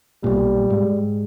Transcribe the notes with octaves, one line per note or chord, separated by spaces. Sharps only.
B1 A#2 G3
G#2